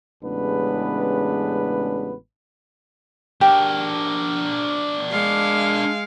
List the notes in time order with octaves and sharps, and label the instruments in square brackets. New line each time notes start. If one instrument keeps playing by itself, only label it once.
[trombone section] A1 C#3 G#3 B3 D4 B4
[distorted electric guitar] D4 A#4 [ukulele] G4
[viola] G#3 F5